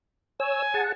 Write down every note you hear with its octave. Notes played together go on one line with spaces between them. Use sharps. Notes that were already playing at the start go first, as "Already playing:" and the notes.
C#5 G#5 E6
G#4 F#5 A5